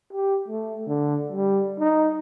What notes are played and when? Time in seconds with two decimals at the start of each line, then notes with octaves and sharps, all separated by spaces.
0.13 G4
0.48 A3
0.87 D3
1.32 G3
1.80 D#4